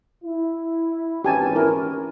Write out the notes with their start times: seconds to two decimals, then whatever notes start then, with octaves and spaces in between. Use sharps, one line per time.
0.24 E4
1.25 G#1 E3 C#4 G4 G#5 A5
1.55 E4 A#4